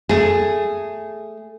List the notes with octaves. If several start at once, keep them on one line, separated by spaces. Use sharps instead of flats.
A3 G#4